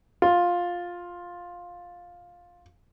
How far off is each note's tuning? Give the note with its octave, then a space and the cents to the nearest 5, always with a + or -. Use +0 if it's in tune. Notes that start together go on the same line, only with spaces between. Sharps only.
F4 +10